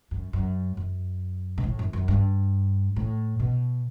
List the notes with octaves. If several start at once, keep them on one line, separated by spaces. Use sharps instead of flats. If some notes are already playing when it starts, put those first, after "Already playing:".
F#2
F#2
F#2
B2
A2
F#2
F#2
G2
A2
B2